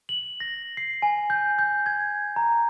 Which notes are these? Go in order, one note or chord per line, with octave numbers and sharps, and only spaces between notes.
F#7
A#6
C7
G#5
G6
G6
G#6
A#5